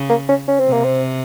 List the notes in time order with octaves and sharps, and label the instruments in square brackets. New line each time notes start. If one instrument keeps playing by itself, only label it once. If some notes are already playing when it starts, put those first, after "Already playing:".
Already playing: [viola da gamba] C#3
[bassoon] A#3
C#4
C#4
C4
[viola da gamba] C3
[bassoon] A#3
C4